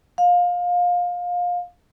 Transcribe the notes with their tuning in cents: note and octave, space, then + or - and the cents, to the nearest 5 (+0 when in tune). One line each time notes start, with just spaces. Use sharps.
F5 +25